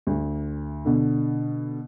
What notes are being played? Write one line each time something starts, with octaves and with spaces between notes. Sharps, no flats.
D2
B2 D3